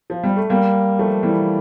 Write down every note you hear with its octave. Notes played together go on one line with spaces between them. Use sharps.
F3
G3
A3
G3 A#3
F3 A3
E3 G3